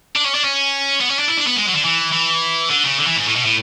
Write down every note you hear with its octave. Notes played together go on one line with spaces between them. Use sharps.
D4
C#4
D4
C#4
B3
C#4
D4
E4
D4
B3
G#3
F#3
D3
E3
E3
D3
C#3
D3
E3
G#2
A2
B2
A2